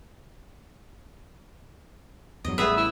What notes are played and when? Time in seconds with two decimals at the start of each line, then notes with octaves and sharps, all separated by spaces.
2.45 E2 G2 F#3 D#5
2.58 A1 A2 G3 A3 B3 G#4 B4 E5
2.77 E4